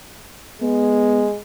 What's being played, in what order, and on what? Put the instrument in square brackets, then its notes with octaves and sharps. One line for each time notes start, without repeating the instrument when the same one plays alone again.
[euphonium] G#3 [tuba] B3